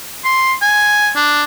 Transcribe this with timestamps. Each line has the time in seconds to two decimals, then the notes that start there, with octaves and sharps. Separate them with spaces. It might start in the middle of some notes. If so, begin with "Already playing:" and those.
0.25 C6
0.62 G#5
1.16 D4